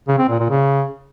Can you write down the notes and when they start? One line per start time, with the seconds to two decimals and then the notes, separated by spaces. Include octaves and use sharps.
0.08 C#3
0.19 C4
0.29 A#2
0.39 A#2
0.50 C#3